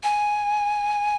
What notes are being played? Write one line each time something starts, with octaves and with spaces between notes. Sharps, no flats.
G#5